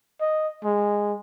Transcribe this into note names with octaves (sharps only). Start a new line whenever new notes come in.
D#5
G#3